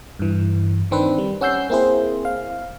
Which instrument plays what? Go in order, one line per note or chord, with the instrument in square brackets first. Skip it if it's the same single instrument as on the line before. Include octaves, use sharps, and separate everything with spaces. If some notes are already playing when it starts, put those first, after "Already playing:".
[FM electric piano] G2 E3
D#3 C4 D4 B4
G3
C#4 F#5 E6 G6 C7
A#3 C4 E4 G#4 C5
F5